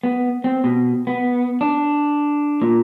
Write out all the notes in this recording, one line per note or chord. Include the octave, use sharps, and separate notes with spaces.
B3
C4
B2
B3
D4
A#2